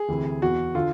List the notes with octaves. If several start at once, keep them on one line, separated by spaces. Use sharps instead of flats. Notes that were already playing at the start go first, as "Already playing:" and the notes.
Already playing: G#4
D2 C3 E3
E2 B2 F#4
D3 F4